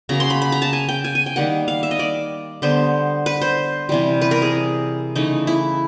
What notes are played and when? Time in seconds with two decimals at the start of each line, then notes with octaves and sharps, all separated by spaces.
0.09 C#3 F#3 A#3 A#5
0.20 C6
0.30 B5
0.42 B5
0.52 A#5
0.62 A5
0.73 G#5
0.89 G5
1.04 G#5
1.15 G#5
1.26 G5
1.36 D#3 G3 A#3 F#5
1.68 F5
1.83 E5
1.91 D#5
1.99 D5
2.62 D3 G3 B3 C5
3.26 B4
3.42 C5
3.89 C3 E3 G3
4.21 B4
4.31 A#4
4.42 G#4
5.16 C#3 E3 A3 D#4
5.47 E4